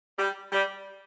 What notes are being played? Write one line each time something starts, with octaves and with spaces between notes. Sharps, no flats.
G3
G3